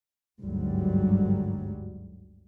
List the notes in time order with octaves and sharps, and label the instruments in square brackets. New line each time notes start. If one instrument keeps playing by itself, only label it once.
[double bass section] G1 D2 G#2 F#3 G3